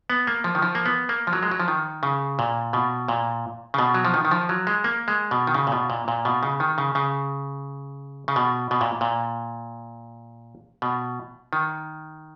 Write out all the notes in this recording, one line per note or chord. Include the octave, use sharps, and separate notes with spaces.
B3
A#3
F3
D#3
F3
A#3
B3
A#3
F3
F#3
G#3
F#3
F3
D#3
C#3
A#2
B2
A#2
C#3
B2
F#3
F3
D#3
D#3
F3
F#3
G#3
A#3
G#3
B2
D#3
C#3
A#2
B2
A#2
A#2
B2
C#3
D#3
C#3
C#3
C#3
B2
B2
A#2
A#2
B2
D#3